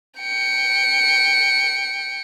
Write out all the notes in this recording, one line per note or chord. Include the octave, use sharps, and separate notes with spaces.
G5 C#7